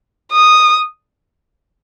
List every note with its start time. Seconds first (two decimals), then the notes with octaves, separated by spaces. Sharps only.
0.32 D#6